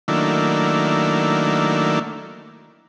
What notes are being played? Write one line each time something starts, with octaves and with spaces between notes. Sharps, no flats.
D#3 F#3 A3 A#3 D4 E4